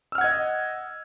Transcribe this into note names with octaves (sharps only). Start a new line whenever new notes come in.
D#5 F#5 E6 F6 G#6